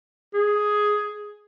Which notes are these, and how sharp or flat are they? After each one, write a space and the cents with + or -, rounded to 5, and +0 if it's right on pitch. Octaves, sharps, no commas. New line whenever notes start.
G#4 +5